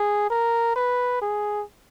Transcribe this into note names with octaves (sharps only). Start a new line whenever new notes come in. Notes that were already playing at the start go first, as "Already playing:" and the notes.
Already playing: G#4
A#4
B4
G#4